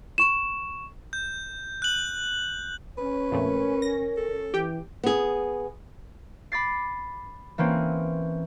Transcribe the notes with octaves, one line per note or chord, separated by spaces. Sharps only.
C#6 E7
G6
F#6 F#7
C#4 B4
F2 A#2 A3 A#4
A#6
A4
E3 G4 G5
B3 G#4
B5 D6 A6 C7
E3 A#3 C4 C#4